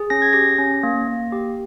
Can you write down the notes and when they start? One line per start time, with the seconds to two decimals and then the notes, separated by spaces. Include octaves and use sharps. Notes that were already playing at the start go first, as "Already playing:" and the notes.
Already playing: G#4
0.10 C#4 A#6
0.22 G#6
0.33 G4 A#6
0.59 C#4
0.83 A#3
1.07 A#3
1.32 G4